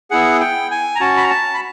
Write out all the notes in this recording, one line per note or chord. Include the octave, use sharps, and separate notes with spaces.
B3 E4 G#4 F#5
G5
G#5
A#5
C#4 F#4 A5
B5
A#5
A5
B5